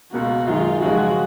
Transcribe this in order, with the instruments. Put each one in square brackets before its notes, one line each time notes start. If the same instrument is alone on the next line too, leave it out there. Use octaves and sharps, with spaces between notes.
[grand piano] C#2 B2 A#3 [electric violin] F#4
[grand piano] F#2 D#3 G#3 [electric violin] F4
[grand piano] F#2 C#3 F3 G#3 [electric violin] F#4